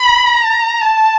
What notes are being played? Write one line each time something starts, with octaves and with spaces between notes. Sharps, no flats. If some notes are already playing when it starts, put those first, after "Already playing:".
Already playing: B5
A#5
A5